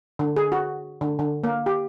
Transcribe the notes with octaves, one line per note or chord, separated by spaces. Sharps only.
D3
G#4
F#4
D3
D3
A#3
G4